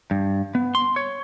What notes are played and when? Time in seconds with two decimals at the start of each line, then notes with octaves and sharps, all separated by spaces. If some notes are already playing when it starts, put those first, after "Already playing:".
0.11 G2
0.55 B3
0.75 C6
0.96 C#5